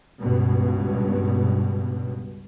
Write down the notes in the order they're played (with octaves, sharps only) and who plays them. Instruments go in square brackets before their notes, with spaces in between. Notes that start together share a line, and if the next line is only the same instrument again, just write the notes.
[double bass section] C#2 G2 B2